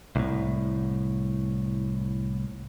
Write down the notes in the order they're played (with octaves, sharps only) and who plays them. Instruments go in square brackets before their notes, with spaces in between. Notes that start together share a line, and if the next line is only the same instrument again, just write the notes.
[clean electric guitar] C2 A2